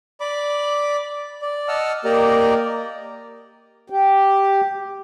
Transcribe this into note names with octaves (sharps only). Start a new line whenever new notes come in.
D5 B5 D6
D5
D#5 F#5 A5 E6 F6
A#3 G4 A#4 D5 D#5 A#5
G4